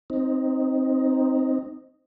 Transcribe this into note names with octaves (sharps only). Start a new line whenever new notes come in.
C4 D#4